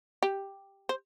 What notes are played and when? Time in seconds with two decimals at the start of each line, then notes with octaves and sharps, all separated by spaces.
0.23 G4
0.89 C5